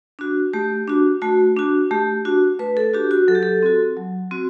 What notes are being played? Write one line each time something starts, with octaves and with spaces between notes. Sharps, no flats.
D4 F#4
A3 G4
D4 F#4
A3 F#4
D4 F#4
A3 G4
D4 F#4
A3 B4
A4
D4 F#4 G4
F#4
F#3 A4
G4
A4
C4 F#4
F#3
C4 F#4